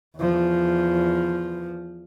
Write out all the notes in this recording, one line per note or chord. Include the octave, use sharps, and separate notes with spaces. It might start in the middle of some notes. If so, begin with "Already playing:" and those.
E2 F3